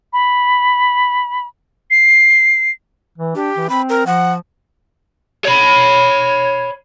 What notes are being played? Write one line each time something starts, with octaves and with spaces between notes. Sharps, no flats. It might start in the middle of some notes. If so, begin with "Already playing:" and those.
B5
C7
E3
D4 G4
E3
C4 B5
A#4
F3 F#5
C#5 B5